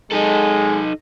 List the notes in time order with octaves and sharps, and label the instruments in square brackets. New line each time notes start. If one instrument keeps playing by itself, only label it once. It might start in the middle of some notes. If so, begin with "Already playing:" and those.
[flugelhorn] G#3 [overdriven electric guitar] D#4 A4